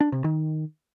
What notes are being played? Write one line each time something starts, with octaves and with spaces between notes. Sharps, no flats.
D4
C3
D#3